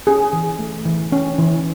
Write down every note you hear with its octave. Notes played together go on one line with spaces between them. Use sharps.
C#4 G#4
E3
A3
E3
C#4
E3